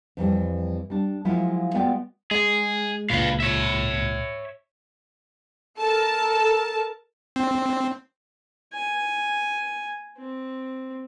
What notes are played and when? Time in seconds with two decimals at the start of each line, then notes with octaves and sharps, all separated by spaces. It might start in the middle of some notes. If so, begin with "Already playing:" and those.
0.17 F2 E3 G3
0.90 G3 D4
1.25 F3 F#3 G#3 A#3 E4 F4
1.74 G#3 B3 F4 F#4 D5 G5
2.31 G#3 G#4
3.10 C#2 A#2 B4 F5
3.40 C#5 E5
5.79 A4 A#4 A5
7.36 C4
8.73 G#5
10.18 C4